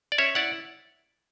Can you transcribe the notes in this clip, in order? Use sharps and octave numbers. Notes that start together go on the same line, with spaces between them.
D5
C#4 C#5 E5
E4 D5 F#5